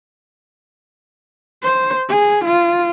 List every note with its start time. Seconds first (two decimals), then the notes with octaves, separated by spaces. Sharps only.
1.63 C5
2.08 G#4
2.45 F4